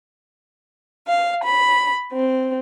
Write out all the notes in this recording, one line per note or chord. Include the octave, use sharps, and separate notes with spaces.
F5
B5
C4